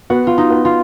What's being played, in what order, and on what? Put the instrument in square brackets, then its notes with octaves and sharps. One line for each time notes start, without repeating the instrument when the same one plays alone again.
[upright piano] B3 [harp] F#4
[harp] F4
D#4
[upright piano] B3
[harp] F4